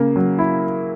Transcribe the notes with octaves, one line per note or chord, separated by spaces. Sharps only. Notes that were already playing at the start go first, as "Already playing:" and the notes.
Already playing: C#3 A#3
F#3
E4